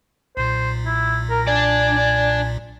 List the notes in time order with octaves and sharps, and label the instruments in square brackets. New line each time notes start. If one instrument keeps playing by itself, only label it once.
[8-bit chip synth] B1 A#2 [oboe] C5
[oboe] E4
A#4
[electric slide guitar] D4 D5 [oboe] G#5